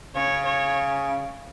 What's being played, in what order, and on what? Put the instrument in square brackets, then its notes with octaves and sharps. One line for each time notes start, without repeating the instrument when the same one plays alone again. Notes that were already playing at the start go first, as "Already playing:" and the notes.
[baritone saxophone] C#3 [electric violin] C#5
[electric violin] C#5